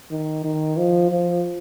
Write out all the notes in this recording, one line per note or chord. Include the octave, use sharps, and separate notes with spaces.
D#3
D#3
F3
F3